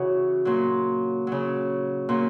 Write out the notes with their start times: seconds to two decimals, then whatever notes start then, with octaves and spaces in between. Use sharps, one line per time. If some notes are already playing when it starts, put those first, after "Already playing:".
Already playing: C#3 E3 F#4
0.45 A#2 F#3
1.27 C#3 F#3
2.09 A#2 F#3